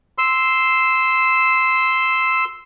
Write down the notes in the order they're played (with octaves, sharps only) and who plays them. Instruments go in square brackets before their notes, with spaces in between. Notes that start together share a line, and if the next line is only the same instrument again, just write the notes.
[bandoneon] C6 E6